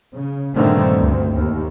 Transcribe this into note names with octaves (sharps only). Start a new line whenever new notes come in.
C#3
G2 A#2 D3 D#3 A3 C4
D2
D#2